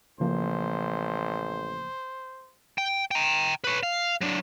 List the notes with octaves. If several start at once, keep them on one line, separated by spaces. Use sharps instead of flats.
A1 C#3 F3 A#3 C5
G5
G5 A#5
B4 C#5
F5
F#3 D4